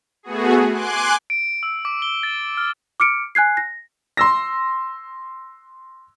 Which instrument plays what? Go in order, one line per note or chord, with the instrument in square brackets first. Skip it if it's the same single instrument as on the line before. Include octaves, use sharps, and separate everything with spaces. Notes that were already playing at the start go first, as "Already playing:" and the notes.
[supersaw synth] A3 B3 F#4 G#4
G#5 C6 D6 F#6
[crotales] D7
E6
D6
G7
A6
F6
[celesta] D6 F6 C#7 D7
G#5 F#6 G#6 C7
A#6
[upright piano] C6 E6 A#6